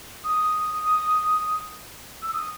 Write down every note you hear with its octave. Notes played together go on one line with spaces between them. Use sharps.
D#6
E6
D#6